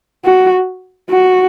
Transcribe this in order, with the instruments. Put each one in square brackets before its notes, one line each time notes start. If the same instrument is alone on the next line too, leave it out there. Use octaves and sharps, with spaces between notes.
[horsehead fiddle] F#4
F#4